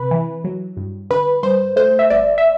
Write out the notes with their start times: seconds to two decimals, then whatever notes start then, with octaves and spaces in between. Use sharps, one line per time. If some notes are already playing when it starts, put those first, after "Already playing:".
Already playing: C3 B4
0.11 E3
0.44 F#3
0.77 G2
1.10 D3 B4
1.43 G2 C5
1.76 A3 C5
1.99 E5
2.10 G1 D5
2.38 E5